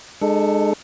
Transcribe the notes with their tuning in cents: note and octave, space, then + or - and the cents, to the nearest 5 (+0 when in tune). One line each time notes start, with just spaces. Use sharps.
G#3 +0 D#4 -45 A4 +0